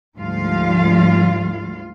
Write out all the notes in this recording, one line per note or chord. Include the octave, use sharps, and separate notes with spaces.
D2 G#2 F3 G3 F4 F5